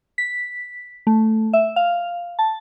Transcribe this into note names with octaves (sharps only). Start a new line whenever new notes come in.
B6
A3
E5
F5
A5